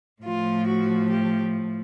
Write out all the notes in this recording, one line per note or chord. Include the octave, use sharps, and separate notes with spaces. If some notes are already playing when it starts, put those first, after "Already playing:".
A2 F3 A3 F4
F#4
G4